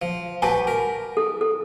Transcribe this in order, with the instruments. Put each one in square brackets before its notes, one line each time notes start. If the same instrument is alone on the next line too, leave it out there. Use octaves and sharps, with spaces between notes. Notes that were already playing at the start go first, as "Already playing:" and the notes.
[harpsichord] F3
[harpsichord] F#4 G4 B4 [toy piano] G#5 A5
[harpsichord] A#4
[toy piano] A4
A4